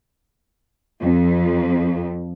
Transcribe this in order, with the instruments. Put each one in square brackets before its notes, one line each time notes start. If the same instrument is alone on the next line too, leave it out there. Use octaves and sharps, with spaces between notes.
[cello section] F2